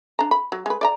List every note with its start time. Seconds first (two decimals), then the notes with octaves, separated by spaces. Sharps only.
0.19 D4 A#5
0.31 B5
0.52 F#3
0.66 G#3 B4
0.81 D5 E5 A#5